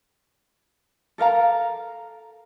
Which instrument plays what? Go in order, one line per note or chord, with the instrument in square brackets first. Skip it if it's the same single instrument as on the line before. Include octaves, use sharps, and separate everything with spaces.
[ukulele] A4 A#4 F5 A#5